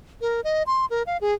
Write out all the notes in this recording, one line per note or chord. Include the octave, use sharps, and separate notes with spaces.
A#4
D#5
C6
A#4
F5
G#4